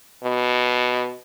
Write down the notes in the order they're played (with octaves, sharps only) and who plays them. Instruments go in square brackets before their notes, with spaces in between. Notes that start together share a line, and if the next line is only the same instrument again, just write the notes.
[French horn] B2